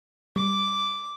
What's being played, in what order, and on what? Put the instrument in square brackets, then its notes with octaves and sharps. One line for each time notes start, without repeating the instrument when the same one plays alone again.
[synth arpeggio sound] G3 [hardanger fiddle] D6